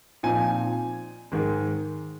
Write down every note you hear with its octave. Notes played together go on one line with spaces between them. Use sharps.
A#2 F3 C4 D#4 G#5
G#2 D#3 G#3